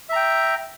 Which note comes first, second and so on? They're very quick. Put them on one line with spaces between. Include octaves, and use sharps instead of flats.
E5 A#5 G5